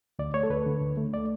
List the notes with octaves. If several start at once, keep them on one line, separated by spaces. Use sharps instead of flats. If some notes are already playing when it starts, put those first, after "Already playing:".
D2 D5
A3 C#5
A4
D2 B4
D3
D2
A3
D5